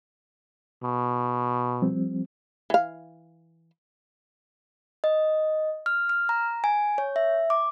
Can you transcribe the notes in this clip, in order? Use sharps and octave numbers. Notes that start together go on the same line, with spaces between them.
B2
F3 G3 C4
E3 F5
D#5
F6
F6
A#5
G#5
C#5
E5
D6